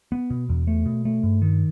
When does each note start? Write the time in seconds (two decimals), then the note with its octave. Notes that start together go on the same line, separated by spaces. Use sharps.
0.12 B3
0.30 B2
0.49 E2
0.67 A3
0.86 B2
1.05 A3
1.23 G2
1.42 D#3